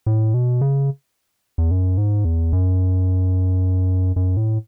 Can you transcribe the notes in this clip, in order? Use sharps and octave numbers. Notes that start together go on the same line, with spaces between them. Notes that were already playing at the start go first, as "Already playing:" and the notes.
A2
B2
C#3
E2
F#2
G#2
E2
F#2
F#2
A2